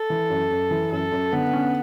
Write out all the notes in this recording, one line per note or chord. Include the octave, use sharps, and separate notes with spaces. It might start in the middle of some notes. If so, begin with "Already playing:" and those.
Already playing: A4
E3
F#2
F#2
E3
F#2 A4
F#2
D3 B3
C#4